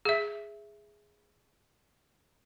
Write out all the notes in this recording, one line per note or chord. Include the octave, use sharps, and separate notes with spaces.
G#4 E5